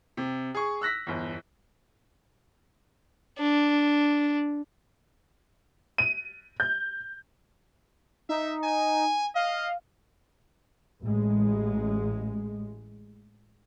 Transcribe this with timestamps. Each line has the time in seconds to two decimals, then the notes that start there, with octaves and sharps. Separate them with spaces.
0.17 C3
0.55 G#4 C#6
0.81 E6 F#6 A#6 B6
1.07 G1 E2
3.38 D4
5.98 D#7
6.60 G6
8.29 D#4 E5
8.63 G#5
9.35 D#5 F5
11.03 A1 G#3